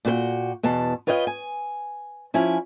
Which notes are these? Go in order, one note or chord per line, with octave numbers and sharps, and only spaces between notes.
A#2 F#4 A#4 G5
E2 B2 A5
F4 B4 C#5 D#5 F5 G5
G#5
F3 C#4 E4 G#5